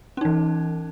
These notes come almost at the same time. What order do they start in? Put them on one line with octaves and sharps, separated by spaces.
C#4 D#4 E3